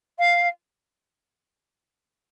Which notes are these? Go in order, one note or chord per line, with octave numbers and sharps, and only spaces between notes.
F5